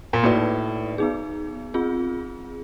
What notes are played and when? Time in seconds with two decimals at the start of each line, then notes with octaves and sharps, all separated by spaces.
0.13 A#2
0.23 A2 A#3 D#4 F#4 B4 D5
0.98 B3 D#4 G#4
1.74 C4 F4 G#4